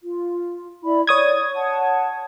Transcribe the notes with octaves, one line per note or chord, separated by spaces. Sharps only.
F4
E4 D5 B5
C#5 D5 D#6 G#6
F#5 A5